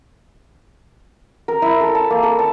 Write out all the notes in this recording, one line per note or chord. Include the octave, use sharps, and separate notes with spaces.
A#4
E4
A4
A5
A#3
A4
A5